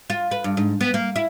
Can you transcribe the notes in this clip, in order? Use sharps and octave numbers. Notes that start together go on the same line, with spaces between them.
F4
B4
G2
G#2
B3
A#3
E4